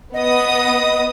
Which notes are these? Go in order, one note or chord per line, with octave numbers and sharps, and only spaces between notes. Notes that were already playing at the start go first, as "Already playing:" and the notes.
B3 D#5 D#6